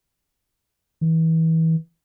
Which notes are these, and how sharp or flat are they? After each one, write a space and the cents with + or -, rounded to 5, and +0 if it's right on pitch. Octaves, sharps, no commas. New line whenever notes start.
E3 -30